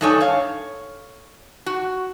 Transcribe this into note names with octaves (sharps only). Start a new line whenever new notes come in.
G2 D4 D#4 A4 C#5 G#5
C#5 F5
F#4